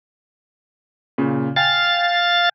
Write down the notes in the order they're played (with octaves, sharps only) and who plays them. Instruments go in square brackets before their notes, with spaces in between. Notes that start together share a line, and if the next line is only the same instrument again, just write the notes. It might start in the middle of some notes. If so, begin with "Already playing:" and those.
[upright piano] A#2 C#3
[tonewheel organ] F5 A6 [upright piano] G5 G#5